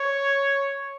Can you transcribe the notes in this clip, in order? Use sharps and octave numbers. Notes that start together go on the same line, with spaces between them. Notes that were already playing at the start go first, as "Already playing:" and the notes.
Already playing: C#5